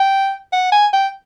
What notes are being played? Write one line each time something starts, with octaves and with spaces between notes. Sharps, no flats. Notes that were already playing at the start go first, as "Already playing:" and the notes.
Already playing: G5
F#5
G#5
G5